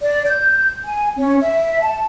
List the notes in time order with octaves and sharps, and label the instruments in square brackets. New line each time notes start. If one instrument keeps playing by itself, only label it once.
[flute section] D5
G6
G#5
C#4
E5
A5